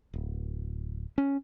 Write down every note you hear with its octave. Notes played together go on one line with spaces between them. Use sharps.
D1
C#4